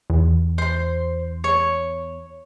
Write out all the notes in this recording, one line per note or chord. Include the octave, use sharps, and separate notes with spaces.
E2
C5 C6
C#5